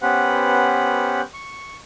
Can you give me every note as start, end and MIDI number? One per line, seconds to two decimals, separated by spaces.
0.02 1.21 59
0.02 1.21 61
0.02 1.21 67
0.02 1.21 71
0.02 1.21 72
0.02 1.21 78
1.34 1.76 85